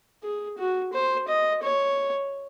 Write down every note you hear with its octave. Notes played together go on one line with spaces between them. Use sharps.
G#4
F#4
C5
D#5
C#5